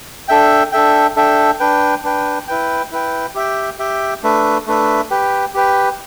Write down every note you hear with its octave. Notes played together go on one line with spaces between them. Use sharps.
D4 A4 E5 G5
D4 A4 E5 G5
D4 A4 E5 G5
D4 B4 G5
D4 B4 G5
E4 B4 G5
E4 B4 G5
G4 E5 G5
G4 E5 G5
A3 D4 B4 E5
A3 D4 B4 E5
G4 B4 G5
G4 B4 G5